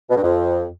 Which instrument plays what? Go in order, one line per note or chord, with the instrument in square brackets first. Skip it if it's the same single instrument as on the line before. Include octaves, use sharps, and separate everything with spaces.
[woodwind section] B2
G2
F2